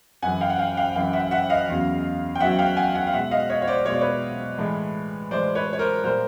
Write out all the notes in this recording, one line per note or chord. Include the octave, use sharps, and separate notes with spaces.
F#2 C#3 E3 F#5 G#5
F5 G5
F#5
F5 G5
F5 G5
F#2 C#3 E3 F5 G5
E5 F#5
E5 F#5
D#5 F5
E2 C#3 F#3
G5
E2 C#3 F#3 E5 F#5
F5 G5
F#5 G#5
F#5 G#5
F5
B2 G#3 E5 F#5
D#5 F5
C#5 D#5
C#5
C5 D5
B2 G#3 C#5
D5
B4 C#5
A2 E3 G#3
A2 E3 G#3 C5 D5
B4 C#5
C#5
A#4 C5
A#2 G3 A#4 C5